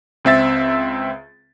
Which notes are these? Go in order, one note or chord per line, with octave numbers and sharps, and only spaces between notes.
C#2 C4 E5 A6